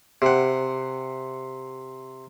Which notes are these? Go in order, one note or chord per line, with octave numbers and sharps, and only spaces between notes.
C3 F#5